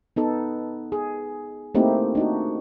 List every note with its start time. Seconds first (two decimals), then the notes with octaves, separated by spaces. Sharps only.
0.16 B3 D#4 A4
0.92 G#4
1.75 A3 A#3 C4 D#4 E4 G4
2.15 D4 D#4 F#4